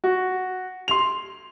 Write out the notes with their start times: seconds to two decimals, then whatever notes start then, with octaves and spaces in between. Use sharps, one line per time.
0.04 F#4
0.88 C6 F7